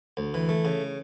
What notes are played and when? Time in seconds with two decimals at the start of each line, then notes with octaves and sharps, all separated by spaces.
0.17 D2
0.34 E3
0.49 A3
0.65 C#3